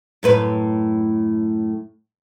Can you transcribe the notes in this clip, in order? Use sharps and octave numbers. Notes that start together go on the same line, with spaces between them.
F#2 A2 B4